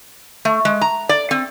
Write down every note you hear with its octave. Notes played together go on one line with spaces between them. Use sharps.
A3
G#3
A#5
D5
C4